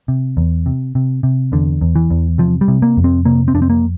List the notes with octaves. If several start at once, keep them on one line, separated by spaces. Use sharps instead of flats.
C3
E2
C3
C3
C3
E2 D3
E2
E3
E2
C3 F3
G3
C3
A#3
F2
C4
C3 A#3
C4
F2 D4
C4
A#3